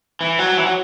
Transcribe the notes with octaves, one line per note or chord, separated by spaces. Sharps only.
E3
F#3
E3
F#3